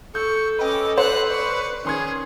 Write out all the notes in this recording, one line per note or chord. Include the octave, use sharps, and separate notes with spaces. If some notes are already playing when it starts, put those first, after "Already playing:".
A4 C#6 G6
C#4 B4 D#5 G5 D6
B4 C5 F#5 F#6
D5 C#6
D#3 C#4 G#4 C6 G#6